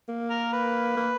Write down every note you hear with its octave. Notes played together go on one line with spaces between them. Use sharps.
A#3
A#4
B4
A#3